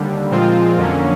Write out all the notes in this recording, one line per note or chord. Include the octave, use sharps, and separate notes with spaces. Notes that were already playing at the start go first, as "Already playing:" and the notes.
Already playing: D#2 D3 G3
A#2 F3 G#3 C4 F4
F2 D3 F#3 A#3 C#4